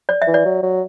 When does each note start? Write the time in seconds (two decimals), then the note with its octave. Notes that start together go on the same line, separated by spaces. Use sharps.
0.09 D5
0.22 E5
0.27 E3
0.34 D5
0.46 F#3
0.63 F#3